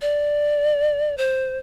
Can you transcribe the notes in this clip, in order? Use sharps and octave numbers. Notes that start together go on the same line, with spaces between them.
D5
C5